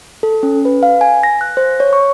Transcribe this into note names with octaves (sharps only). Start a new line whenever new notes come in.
A4
C#4
B4
F5
G#5
A#6
F#6
C5
C#5
C#6